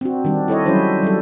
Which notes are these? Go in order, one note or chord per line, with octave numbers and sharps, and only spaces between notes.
C4 D4 F#4
D#3 G3 D4
E4 A4 C#5 D#5
F#3 G3 C#4 E4 C5
F#3 G3 A4